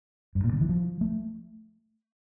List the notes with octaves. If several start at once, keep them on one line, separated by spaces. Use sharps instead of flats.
G2
A#2
D3
E3
F3
A3